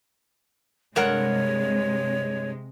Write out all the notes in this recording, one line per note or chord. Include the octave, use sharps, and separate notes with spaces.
G2 C3 G#3 A#4 C#5 F#5